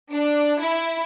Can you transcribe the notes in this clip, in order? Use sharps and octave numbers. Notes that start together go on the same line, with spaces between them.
D4
E4